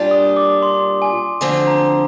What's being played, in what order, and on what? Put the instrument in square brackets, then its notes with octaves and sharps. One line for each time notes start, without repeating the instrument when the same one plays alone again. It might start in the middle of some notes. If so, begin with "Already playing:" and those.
Already playing: [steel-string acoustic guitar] A#2 G3 D4 F4
[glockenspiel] D#6
D6
C6
G#5
[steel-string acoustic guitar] D2 D3 F3 C4 [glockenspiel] G#5
[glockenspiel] A#5